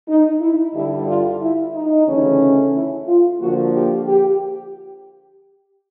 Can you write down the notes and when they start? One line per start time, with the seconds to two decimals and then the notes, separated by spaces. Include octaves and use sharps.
0.08 D#4
0.41 E4
0.74 G2 D3 G3 E4
1.08 F4
1.41 E4
1.74 D#4
2.07 D2 C#3 E3 A3 C#4
2.74 E4
3.07 F4
3.40 D3 F3 A#3 F#4
3.74 G4
4.08 G4